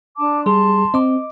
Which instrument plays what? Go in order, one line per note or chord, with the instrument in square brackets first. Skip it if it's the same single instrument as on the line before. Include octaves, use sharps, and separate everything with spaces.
[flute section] D4 A5 D6
[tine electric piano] G3 G#4 [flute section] A5 C6
[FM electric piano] C4 [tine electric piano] D#5 D6